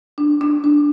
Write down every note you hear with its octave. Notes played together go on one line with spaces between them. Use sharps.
D4
D4
D4